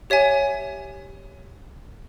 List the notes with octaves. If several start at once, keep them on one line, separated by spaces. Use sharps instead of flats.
G4 C#5 E5 G#5